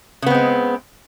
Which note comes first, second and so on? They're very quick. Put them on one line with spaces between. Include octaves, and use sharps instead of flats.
C#3 B3 C4 G#3